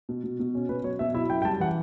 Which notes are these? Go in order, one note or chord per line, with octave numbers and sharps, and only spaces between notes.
B2
B2
B2
C#4
B2 B4
F#3 C#5
B2 E5
E4 E5
F#2 G5
G5
G3 A5
E3 F#5